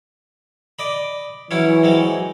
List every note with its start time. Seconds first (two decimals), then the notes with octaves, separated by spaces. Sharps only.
0.79 D5 D#5 B5
1.51 E3 F#3 C#4 E4
1.83 F#3 G#3 C4